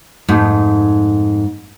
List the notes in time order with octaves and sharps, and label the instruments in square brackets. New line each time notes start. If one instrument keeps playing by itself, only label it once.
[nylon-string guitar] F2 G#2 A3 D#4